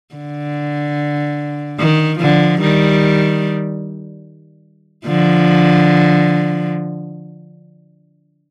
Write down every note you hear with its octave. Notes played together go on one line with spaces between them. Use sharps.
D3
D#3
D3 F3
D#3 G3
D3 F3